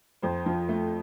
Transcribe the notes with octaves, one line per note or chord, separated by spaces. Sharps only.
F2 C5
F3
A3